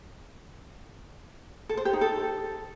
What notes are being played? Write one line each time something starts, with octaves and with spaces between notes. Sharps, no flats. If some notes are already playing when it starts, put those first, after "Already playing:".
A4
C5
G4
D#4
A4